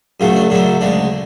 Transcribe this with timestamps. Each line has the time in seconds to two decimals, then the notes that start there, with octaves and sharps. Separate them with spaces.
0.20 F#2 C#3 F#3 A3 F4
0.36 D4
0.50 F#2 C#3 F#3 A3 D4
0.81 D2 C#3 G#3 D4